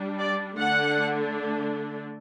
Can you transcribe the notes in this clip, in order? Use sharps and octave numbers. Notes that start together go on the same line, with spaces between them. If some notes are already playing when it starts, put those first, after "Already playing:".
Already playing: G3 D4
D5
D3 A3 D4 F#5